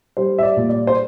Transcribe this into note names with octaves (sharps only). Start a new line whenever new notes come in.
G3 C5
E5
D5
A#2
D5
C5